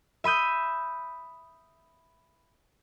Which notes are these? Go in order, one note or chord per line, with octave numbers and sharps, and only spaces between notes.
E5 B5 D#6 G6